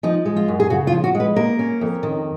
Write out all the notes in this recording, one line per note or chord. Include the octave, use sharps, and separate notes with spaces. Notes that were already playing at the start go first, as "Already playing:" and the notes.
F3 D#4
G#3
F4
F#2
G#4
C#3 F#4
F4
F3
F#4
G#3
B4
A#3 A#4
C#4
F2
D#3